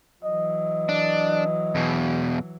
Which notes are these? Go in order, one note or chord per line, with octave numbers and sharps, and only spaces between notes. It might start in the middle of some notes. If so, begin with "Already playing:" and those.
E3 F#3 D#5
D4
E2 B2